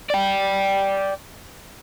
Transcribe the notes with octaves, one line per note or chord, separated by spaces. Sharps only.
D5 G5